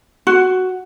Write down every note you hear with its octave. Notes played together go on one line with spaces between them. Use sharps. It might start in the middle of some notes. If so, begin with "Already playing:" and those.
F#4